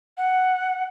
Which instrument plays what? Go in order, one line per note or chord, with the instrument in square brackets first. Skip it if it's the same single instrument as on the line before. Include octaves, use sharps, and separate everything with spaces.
[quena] F#5